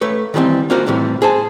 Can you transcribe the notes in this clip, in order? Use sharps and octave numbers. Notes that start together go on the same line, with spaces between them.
A3 B4 C#5
D#3 E3 G3 A#3 C4
A#3 D4 F4 F#4 A#4 C5
A2 C3 E3 G3
G#4 C5 A5